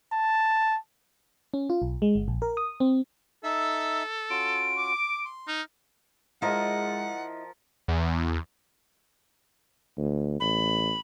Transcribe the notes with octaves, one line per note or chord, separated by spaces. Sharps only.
A5
C#4
F4
B1
G#3
G1
A#1
A#4
D#6
C4
D#4 A4 E5 E6
C#4 F4 F#4 D7
D6
C6
D#4 F6
F3 G#3 E4 A#4 D#5 F#5
E2
D2
A1 B5